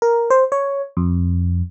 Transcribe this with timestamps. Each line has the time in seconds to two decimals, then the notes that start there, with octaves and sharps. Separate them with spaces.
0.02 A#4
0.30 C5
0.52 C#5
0.97 F2